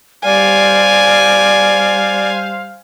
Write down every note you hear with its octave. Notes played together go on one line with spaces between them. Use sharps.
G3 C5 D5 F5 G#5